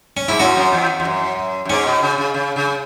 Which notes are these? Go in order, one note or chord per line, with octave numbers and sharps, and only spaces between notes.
C#4
G#2 E4
F#2 C#4 F#4
F#2
E2
E2
F#2
F#2
G#2 C#4
B2
C#3
C#3
C#3
C#3